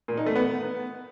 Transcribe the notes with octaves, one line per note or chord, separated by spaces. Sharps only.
A#2
D#4
A3
B3